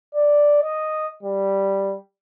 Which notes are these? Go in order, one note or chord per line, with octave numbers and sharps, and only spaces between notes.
D5
D#5
G3